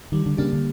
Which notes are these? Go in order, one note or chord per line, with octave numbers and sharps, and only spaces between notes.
D#3 G3
D3
C#3 A#3 D4 G4
D3